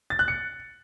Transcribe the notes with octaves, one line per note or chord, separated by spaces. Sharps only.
A6
F#6
C#7